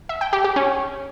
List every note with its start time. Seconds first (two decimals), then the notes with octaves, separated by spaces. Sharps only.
0.09 E5
0.21 G5
0.33 G4
0.44 G4
0.56 C#4